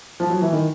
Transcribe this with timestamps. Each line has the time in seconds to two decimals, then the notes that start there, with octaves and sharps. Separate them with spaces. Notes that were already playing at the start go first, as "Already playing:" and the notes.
0.20 F3
0.30 F#3
0.41 E3
0.52 D#3